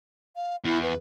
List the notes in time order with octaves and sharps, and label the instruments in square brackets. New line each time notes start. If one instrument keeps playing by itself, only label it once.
[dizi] F5
[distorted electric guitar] E2 [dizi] E4
[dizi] B4